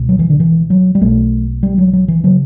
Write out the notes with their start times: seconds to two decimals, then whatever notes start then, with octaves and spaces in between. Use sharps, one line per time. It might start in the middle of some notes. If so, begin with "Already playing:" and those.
Already playing: C#2 B2
0.09 F#3
0.19 E3
0.30 D3
0.40 E3
0.70 F#3
0.95 G3
1.01 B1 B2 A3
1.63 G3
1.78 F#3
1.93 F#3
2.08 E3
2.24 C#3 F#3